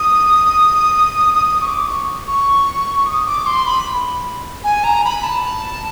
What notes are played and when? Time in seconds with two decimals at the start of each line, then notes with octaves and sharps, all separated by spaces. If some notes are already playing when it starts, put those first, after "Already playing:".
Already playing: D#6
1.48 D#6
1.61 C#6
1.68 D6
1.88 C#6
2.27 C#6
3.06 D#6
3.26 D6
3.46 C6
3.66 B5
4.64 G#5
4.84 A#5
5.04 B5
5.24 A5